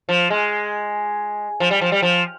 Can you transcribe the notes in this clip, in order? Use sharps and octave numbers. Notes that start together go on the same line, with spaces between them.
F3
G#3
F3
G3
F3
G3
F3